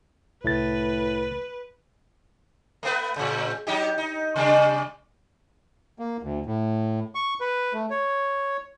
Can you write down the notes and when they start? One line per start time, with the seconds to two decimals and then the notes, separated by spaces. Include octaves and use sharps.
0.44 C2 A2 B4 A6
2.83 A3 B3 B4
3.16 A2 C#3
3.67 F#3 D#4 G4
3.98 D#4
4.36 C3 G3 D4
5.99 A#3
6.23 D2
6.46 A2
7.15 C#6
7.41 B4
7.73 A3
7.90 C#5